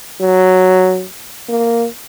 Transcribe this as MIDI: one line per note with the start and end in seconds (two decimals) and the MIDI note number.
0.21 1.04 54
1.49 1.87 58